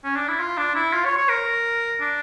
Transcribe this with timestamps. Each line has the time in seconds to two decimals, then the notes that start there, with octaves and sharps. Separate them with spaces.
0.04 C#4
0.16 D4
0.28 E4
0.39 F4
0.57 D4
0.75 E4
0.93 F4
1.05 C#5
1.17 C#5
1.29 A#4
2.01 D4